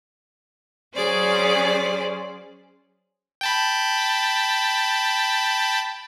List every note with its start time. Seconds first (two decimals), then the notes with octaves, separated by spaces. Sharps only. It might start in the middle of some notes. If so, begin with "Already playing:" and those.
0.95 F#3 C#4 G#4 C5 D5
3.41 G5 A5 B5